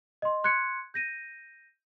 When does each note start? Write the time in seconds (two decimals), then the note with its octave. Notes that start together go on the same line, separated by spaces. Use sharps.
0.22 D#5 C6
0.44 C6 F#6 G#6 C#7
0.94 G6 A#6 D#7